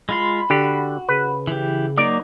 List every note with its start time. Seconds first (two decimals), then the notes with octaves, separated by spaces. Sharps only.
0.09 G#3 F4 B5 C6
0.50 D3 F#4 G4
1.09 C#3 B4
1.47 E3 G4
1.98 F#3 A#3 D#4 D5